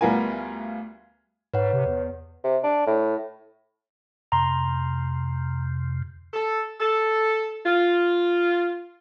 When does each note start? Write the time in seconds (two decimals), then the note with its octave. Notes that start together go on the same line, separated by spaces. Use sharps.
0.01 D2 G3 B3 F4 A#4 G#5
1.54 G#2 B4 C#5 F#5
1.73 C3
1.86 E2
2.44 C3
2.64 D4
2.87 A2
4.32 F2 C3 A#5 C6
6.34 A4
6.80 A4
7.65 F4